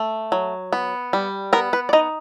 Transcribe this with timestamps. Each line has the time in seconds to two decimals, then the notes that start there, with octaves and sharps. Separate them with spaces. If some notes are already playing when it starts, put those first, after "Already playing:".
Already playing: A3
0.32 F#3
0.73 B3
1.13 G3
1.53 B3 A#4
1.73 B4
1.89 D5
1.93 D#4 D#5